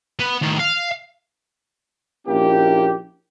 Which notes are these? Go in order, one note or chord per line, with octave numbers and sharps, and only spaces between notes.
B3
A2 D#3
F5
A#1 A#3 C#4 E4 G4